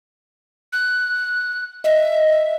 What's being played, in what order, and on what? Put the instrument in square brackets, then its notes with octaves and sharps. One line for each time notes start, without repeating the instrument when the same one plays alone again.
[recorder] F#6
[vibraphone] D#5 [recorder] E5